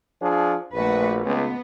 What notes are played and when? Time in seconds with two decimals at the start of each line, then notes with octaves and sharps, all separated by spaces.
0.22 F3 D4 G#4
0.73 A#1 A3 F#4 B4
1.25 C#2 B3